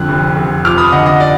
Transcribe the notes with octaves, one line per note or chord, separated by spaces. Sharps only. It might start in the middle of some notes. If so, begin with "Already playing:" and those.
Already playing: F2 D3 F#6
F1
F1
F3 D6 F6
B5 D#6
D3 D#5 F#5
D#5
D5